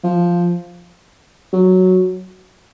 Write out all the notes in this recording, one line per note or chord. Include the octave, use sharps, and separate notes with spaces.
F3
F#3